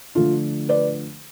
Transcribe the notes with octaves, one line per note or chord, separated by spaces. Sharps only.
D3 F3 A3 D4 F4
B4 D5